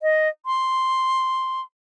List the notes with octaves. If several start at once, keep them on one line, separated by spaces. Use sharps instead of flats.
D#5
C6